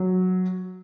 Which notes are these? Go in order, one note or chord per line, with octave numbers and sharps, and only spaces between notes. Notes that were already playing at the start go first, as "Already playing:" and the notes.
Already playing: F#3